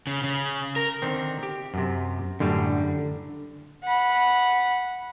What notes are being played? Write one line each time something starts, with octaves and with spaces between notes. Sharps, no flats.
C#3
C#3
A#4
D3 D#3 C4
G4
F#2 C3
F#2 A2 D3 G3
F#5 B5